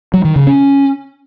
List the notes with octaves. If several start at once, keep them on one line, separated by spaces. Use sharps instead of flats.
F#3
D#3
C#3
C#4